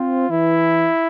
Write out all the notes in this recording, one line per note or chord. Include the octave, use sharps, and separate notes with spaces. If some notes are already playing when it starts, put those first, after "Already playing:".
Already playing: C4 F4
E3 E4